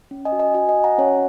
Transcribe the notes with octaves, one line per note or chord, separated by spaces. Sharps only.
C#4
D#5 G#5
F#4
D#5 G#5
F#4 D#5 G#5
D#5 G#5
F#4
F#5 A#5
C#4 C#5 F#5